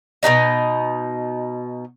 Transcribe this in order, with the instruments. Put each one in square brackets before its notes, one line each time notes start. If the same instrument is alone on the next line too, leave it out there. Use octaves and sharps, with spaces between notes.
[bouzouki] B2 C#4 D#4 D#5